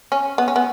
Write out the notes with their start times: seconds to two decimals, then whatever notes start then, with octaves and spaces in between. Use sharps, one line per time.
0.12 C#4
0.38 B3
0.48 C#4
0.56 B3